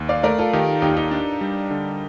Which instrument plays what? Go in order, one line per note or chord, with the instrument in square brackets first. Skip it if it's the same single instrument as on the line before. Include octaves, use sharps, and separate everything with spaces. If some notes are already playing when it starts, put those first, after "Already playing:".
Already playing: [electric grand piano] D#2
[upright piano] D5 F5
[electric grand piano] A3 [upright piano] A#4 D5
[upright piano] F4 A4
[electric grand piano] D#3 [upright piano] D#4 G4
[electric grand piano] D#2 [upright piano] D#4 G4
[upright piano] D#4 G4
[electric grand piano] D4
G3
D3